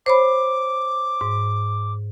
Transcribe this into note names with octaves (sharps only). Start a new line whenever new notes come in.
C5 C#5 B5 D6
G#2